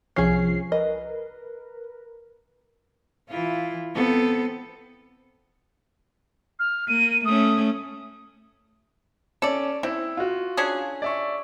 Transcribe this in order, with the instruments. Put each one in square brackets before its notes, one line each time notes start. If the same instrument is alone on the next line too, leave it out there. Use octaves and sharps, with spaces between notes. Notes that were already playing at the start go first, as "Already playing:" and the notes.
[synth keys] C2 F3 C7 [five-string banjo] C#4 G#4
[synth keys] A#4 B4 [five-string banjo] D#5
[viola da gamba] E3 E4 F4
B3 C4 A4
[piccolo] F6
[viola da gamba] A#3 [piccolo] D#7
[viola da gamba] A3 C#4 [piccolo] D#6
[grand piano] C#4 [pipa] A4 D5
[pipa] C4 [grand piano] E4
[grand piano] F4 F#4
[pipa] C#4 D4 G#4
[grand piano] D5 E5 C#6